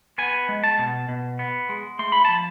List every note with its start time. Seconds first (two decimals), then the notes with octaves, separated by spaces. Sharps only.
0.18 B3 G#5
0.49 G#3
0.64 A5
0.79 B2
1.09 B2
1.39 B3
1.69 G#3
1.99 A3 C6
2.12 B5
2.25 F3 A5